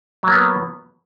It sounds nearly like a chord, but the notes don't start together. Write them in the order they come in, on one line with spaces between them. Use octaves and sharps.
F#3 A#3 B3